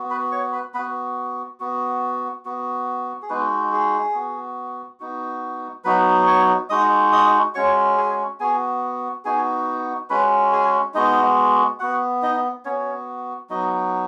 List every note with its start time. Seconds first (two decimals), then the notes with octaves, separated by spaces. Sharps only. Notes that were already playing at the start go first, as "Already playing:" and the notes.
Already playing: B3 F#4
0.10 B4 B5
0.31 C#5 C#6
0.53 B4 B5
0.74 B3 F#4 B4 B5
1.60 B3 F#4
2.45 B3 F#4
3.22 G#4
3.29 G#3 B3 D#4 F#4 B4
3.72 G#4
4.15 B3 F#4
5.00 B3 D#4 F#4
5.84 F#3 B3 D#4 F#4 B4 B5
6.27 C#5 C#6
6.70 G#3 D#4 F#4 D#5 D#6
7.12 D#5 D#6
7.55 G#3 C#4 F#4 C#5 C#6
7.97 G#4 G#5
8.40 B3 F#4 G#4 G#5
9.25 B3 D#4 F#4 G#4 G#5
10.10 G#3 C#4 F#4 B4 B5
10.52 G#4 G#5
10.94 G#3 B3 D#4 F#4 D#5
11.79 B3 F#4 F#5
12.22 D#4 D#5
12.65 B3 C#4 F#4 C#5
13.50 F#3 B3 D#4 F#4 D#5